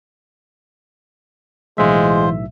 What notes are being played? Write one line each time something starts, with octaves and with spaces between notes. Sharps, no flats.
B1 A2 E3 G#3 F4 C5 E5